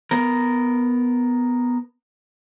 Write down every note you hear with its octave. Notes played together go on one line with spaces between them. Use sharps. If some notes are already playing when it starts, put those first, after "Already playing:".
B3 A#4